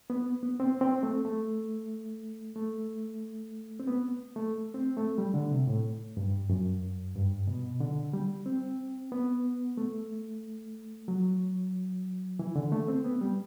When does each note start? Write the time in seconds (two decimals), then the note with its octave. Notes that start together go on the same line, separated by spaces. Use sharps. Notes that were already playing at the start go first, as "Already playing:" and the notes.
0.10 B3
0.43 B3
0.60 C4
0.81 C4
1.03 A3
1.25 A3
2.56 A3
3.80 C4
3.87 B3
4.36 A3
4.74 C4
4.97 A3
5.18 G3
5.34 D3
5.51 C3
5.67 A2
6.17 G2
6.50 F#2
7.15 G2
7.48 B2
7.80 D3
8.13 G3
8.46 C4
9.12 B3
9.77 A3
11.08 F#3
12.39 E3
12.56 D3
12.72 A3
12.88 C4
13.04 B3
13.21 G3